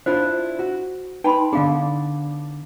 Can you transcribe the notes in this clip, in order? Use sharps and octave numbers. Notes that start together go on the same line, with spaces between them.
D4 E4 F4 C5
F#4
D#4 B4 G5 B5 C6
D3 B3 D4 G#4 F5